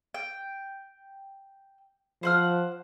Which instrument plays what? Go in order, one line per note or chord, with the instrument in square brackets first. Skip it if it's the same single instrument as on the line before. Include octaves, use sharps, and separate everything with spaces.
[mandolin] G5
[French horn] F3 [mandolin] C5 F#5 F6